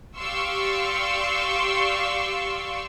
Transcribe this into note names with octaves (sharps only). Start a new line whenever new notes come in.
G4 D5 F5 C6 C#6 E6